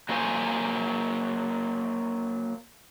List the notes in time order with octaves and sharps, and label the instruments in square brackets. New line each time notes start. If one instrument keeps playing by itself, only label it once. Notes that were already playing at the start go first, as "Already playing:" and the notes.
[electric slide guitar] F#3 A#3 C5 G#5